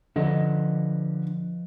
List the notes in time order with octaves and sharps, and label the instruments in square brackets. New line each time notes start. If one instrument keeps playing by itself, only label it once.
[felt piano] D3 [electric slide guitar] F3 B4 D#5